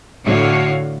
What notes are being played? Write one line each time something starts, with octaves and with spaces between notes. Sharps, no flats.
A2 D3 F#4 C#5 F5